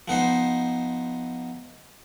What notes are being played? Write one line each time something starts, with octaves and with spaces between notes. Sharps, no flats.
F3 B3 D#4 C5